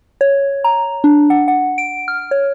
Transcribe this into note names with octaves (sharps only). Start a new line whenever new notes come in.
C#5
A#5
D4
F#5
F#5
D7
F6
C#5